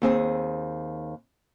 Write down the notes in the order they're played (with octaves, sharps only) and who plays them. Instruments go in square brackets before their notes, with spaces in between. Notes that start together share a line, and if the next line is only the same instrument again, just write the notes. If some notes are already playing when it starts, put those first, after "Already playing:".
[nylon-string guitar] D#2 C4 G#4